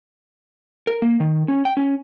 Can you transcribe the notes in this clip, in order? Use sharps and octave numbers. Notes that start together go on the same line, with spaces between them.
A#4
A#3
D#3
C#4
G5
C#4